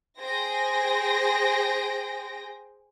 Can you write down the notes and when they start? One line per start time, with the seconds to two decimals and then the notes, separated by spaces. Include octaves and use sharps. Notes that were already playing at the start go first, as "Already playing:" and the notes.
0.20 G#4 C5 G5 A#6